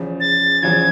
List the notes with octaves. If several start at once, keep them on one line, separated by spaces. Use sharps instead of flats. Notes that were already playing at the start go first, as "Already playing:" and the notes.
Already playing: E2 C#3 F3
A6
E2 C#3 F3 G#6